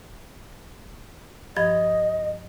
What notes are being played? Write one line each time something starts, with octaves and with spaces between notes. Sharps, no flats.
G2 F3 D#5 G#6